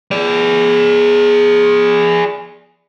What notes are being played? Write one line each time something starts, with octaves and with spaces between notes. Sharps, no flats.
G#4 D5